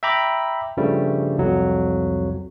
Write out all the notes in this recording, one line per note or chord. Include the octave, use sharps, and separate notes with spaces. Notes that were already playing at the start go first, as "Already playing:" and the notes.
E5 G5 A#5 B5 D6
G2 C#3 F3 G3 A3
C2 F2 F#3